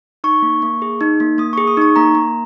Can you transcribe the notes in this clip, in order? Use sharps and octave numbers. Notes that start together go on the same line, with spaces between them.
D#4 C#6
A#3
A#3
G#4
D#4
A#3
A#3 D#6
G#4 C#6
D#6
D#4 C#6
A#3 A#5
A#3